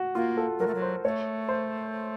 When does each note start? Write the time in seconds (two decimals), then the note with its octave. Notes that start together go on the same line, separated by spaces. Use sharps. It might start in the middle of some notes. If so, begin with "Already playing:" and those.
Already playing: F#4
0.15 A#3 F4
0.37 A4
0.59 F#3 A#4
0.67 A3
0.75 F#3
0.82 C5
1.04 A3 C#5
1.49 C5